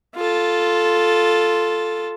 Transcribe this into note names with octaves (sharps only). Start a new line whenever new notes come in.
F4 A4